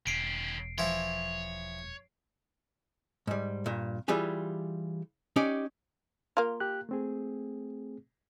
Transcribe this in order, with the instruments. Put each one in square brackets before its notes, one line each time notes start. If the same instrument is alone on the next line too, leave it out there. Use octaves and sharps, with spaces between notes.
[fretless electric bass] E1 [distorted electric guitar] D#3 C#4 [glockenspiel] C7 D7
[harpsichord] E3 F3 E4 [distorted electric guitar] C#5
[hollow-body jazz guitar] G#2 G3
G2 A#2
E3 G3 F4 G4 G#4
C#4 D#4 G4 D5
[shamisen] A#3 F4
[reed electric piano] G4 F#6
A3 C4 G#4